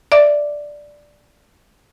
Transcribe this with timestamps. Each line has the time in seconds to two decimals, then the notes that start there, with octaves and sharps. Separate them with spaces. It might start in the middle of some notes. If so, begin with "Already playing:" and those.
0.12 D5 E5 D6